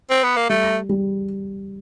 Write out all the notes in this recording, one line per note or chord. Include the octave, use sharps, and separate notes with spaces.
C4
B3
A#3
G3 A3
G3